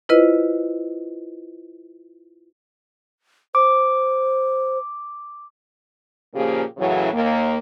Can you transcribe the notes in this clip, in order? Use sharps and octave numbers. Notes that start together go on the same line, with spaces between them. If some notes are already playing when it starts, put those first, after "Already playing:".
E4 F4 B4 C5 D#5
C5 D6
A#2 C#3 F3 A#3 G4 G#4
F#2 A2 C#3 E3 F#3
D#2 A#3